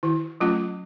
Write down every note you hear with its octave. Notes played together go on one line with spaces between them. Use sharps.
D#3 E4
F#3 A3 C#4 F4